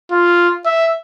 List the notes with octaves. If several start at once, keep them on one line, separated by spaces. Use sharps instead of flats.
F4
E5